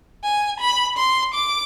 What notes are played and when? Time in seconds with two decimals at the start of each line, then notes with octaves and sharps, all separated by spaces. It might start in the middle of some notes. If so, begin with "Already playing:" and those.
0.24 G#5
0.60 B5
0.97 C6
1.34 D6